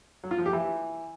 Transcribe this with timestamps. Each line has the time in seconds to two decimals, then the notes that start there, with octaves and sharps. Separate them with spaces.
0.24 F#3
0.31 F4
0.38 F3
0.46 G4
0.53 E3